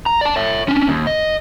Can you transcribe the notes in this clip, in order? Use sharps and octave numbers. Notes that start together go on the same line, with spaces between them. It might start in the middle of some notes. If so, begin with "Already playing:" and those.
A#5
D5 A5
C#5 E5
C#4 D4
D#2
D#5